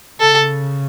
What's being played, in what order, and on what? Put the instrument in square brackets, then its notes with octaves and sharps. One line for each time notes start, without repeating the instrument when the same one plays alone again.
[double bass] C#3 [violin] A4